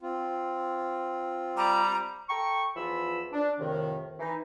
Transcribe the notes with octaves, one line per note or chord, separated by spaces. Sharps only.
C4 F4
G3 A#5
A4 G5 A#5 C#6
E2 E3 F3 F4 B5 E6
D4
F2 A2 C3 D#3
E3 D#4